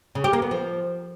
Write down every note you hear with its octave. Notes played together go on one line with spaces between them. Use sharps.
C#3
G4
A#3
B3
F3